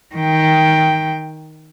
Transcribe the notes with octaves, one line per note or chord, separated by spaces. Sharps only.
D#3 G5